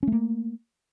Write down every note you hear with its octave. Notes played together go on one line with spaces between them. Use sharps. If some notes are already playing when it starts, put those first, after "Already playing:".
A3 A#3 C#4